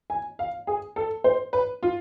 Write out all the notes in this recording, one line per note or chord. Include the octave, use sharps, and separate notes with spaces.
G#5
F5
G#4
A4
C5
B4
F4